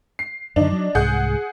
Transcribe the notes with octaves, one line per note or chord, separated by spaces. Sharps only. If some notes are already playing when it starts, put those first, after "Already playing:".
C7
F#2 D3 D4 D#4
F#3
C2 G#2 G#4 F#5 G6